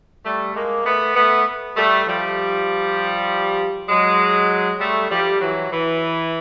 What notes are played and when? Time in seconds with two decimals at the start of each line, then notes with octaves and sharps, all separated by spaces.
0.25 G3 A3
0.55 G#3 A#3
0.85 A3 B3
1.16 A3 B3
1.76 G3 A3
2.07 F3 G3
3.89 F#3 G#3
4.80 G3 A3
5.11 F3 G3
5.41 E3 F#3
5.71 E3